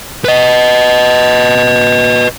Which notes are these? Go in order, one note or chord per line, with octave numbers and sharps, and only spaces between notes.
B4 D#5